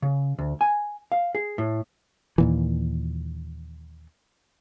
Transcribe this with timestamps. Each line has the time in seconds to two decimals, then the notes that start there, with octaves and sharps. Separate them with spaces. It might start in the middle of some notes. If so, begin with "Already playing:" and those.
0.02 C#3
0.39 D2
0.61 G#5
1.12 F5
1.35 G#4
1.58 A2
2.38 D#2 A#2 E3